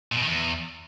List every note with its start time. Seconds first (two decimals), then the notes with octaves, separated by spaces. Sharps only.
0.12 A#2
0.17 B2
0.22 D#3
0.27 E2